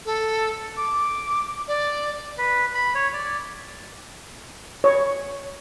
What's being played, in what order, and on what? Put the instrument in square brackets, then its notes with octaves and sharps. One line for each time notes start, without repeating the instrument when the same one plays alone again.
[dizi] A4
D6
D5
[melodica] B4
B5
C#5
D5
[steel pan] C#5